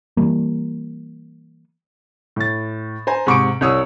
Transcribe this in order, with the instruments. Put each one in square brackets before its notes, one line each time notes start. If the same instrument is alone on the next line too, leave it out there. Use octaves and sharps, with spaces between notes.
[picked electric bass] E3 F#3 G3 A#3
[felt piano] A2 A6
C5 G#5 A#5
G#2 C3 C#6 D6 C#7 D7
C2 C#5 D#6 E6